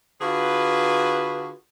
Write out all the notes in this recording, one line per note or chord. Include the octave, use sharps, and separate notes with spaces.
D3 F4 F#4 G#4 B4